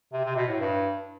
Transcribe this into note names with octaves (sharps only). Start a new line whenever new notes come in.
C3
C3
B2
A2
G2